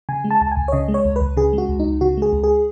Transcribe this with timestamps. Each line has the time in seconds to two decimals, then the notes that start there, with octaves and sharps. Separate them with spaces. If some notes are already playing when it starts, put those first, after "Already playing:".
0.09 C#3 G#5
0.24 G#3
0.31 A5
0.41 C#2 A5
0.51 G#5
0.57 C#2
0.68 C#5
0.72 C#3 D#5
0.88 G#3
0.94 C#5
1.05 C#2
1.16 C#2 B4
1.37 C#3 G#4
1.53 G#3
1.58 F#4
1.69 C#2
1.80 C#2 D#4
2.01 C#3 F#4
2.17 G#3 G#4
2.33 C#2
2.44 G#4